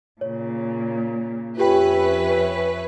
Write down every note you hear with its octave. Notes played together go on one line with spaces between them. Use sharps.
A#2 C#3 C#5
F2 C#4 F4 G4 B4 E5 G5